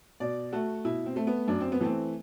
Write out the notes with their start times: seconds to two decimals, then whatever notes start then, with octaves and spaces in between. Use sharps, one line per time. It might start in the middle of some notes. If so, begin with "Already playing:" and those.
0.20 B2 D5
0.52 A3 F#4
0.85 B2 E4
1.06 C4
1.16 A3
1.27 B3
1.48 F#2 D4
1.60 C4
1.72 B3
1.81 E3 A3 C4